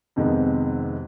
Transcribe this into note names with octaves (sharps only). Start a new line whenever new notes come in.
F2 C3 D#3 G#3 B3